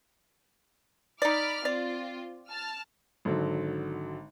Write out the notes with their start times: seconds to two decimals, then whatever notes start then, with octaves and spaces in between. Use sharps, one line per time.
1.22 D#4 D5 B5 D6 F6
1.65 C4 F4 D5
2.48 A5 F6
3.25 G#1 D3 F#3